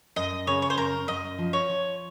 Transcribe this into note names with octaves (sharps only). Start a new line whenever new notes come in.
F#2 D#5
C#3 C#5
C#5
C5
F#2 A#4
F#2 D#5
F3
C#5
F3